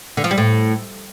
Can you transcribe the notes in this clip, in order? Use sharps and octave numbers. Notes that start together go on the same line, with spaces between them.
D3
F3
G3
A2